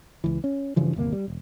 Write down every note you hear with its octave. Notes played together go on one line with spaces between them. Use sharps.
C#2 E3
C#4
G2 C#3 E3 F3
G1 D#2 C3 A#3
G3
E1